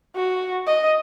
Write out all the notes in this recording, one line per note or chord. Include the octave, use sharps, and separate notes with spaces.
F#4
D#5